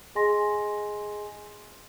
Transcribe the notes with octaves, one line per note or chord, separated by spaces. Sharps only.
G#4 D#5 G#5 C6 A#6